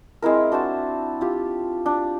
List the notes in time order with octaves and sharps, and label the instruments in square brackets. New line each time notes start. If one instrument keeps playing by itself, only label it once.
[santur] G#3 C4 E4 A#4
D4 F#4 C5 A5
F4 G4
D4